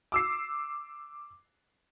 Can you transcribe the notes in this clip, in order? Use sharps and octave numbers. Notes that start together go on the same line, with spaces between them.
D6 E6 C7